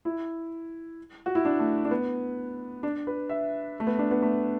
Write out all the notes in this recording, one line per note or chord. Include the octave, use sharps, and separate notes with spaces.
E4
F#4
E4
D4
A3
D4
B3
D4
B4
E5
A3
B3
D4
B3
A3